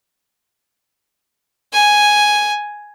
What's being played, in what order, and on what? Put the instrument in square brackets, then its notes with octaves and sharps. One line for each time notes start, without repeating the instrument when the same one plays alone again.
[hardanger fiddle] G#5